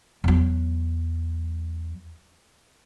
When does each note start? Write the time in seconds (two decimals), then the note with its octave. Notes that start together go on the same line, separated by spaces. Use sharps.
0.24 E2 F#3